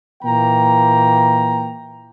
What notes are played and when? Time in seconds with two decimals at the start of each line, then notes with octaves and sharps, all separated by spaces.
0.23 A#2 E3 A#3 G5 A#5